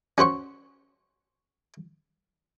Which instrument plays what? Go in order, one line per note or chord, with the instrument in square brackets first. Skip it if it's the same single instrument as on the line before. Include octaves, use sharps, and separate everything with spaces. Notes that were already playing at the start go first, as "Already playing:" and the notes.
[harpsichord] C#4 F#4 C5 C#6